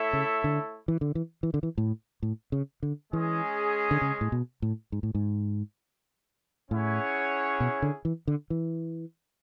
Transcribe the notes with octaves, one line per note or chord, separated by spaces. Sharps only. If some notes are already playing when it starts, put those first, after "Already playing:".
Already playing: A3 E4 A4 C#5 E5
C#3
D3
E3
D3
E3
E3
D3
E3
A2
A2
C#3
D3
E3 G#3 C#4 G#4
D3
C#3
A2
B2
A2
G#2
A2
G#2
A2 C#4 E4 G#4 C#5 F#5
B2
D3
E3
D3
E3